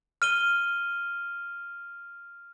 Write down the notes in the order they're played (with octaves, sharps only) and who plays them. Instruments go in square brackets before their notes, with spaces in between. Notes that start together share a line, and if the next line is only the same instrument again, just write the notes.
[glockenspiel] F6 D#7 G7